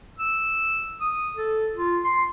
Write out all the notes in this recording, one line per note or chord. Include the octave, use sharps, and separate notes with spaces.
E6
D#6
A4
F4
C6